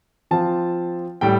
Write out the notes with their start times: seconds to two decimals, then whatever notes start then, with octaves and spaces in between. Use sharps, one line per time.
0.31 F3 C4 F4 A5
1.21 A2 G3 G5